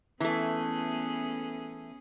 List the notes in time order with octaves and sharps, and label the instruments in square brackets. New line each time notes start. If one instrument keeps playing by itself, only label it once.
[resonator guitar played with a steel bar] E3 A3 [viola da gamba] B3 C#4 G#4